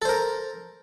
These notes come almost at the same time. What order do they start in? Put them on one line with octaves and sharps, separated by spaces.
A4 C5 A#4